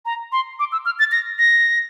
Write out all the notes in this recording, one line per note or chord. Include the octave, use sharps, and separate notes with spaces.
A#5
C6
D6
E6
F6
A6
A#6
A#6